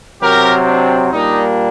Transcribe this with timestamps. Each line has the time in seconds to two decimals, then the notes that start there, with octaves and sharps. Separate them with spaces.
0.22 C3 F#3 C4 G4 A#4
0.67 D4
1.11 A#2 G3 A#3 D4 D#4